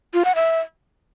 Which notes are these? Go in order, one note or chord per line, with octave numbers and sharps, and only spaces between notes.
F4
F#5
E5